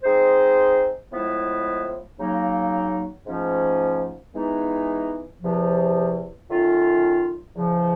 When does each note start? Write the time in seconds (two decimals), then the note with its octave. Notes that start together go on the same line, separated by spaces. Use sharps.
0.03 G#3 C4 D#4 G#4 C5
1.11 A2 F3 G#3 B3 E4
2.18 C#3 F#3 A#3 D#4
3.26 G#2 F3 A3 C#4
4.33 E3 G#3 B3 D#4
5.41 E2 C3 F3
6.49 D#3 F#3 A3 C#4 F4
7.56 E2 C#3 F3